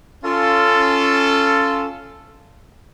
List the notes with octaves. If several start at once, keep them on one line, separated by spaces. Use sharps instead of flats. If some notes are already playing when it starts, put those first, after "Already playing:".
C#4 F4 A4